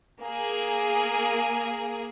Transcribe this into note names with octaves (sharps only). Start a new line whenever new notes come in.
A#3 G#4